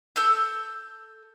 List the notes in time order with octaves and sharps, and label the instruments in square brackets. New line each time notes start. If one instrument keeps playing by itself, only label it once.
[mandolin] A4 E6 G6